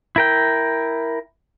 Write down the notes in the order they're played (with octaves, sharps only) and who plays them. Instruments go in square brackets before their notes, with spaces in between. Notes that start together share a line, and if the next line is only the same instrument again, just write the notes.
[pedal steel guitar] E4 A#4 G5